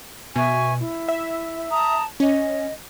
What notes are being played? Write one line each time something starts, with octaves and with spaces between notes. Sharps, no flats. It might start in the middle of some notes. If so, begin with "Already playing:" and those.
B2 E5 G#5 C#6
E4
E5
A5 A#5 D#6
C#4 D#5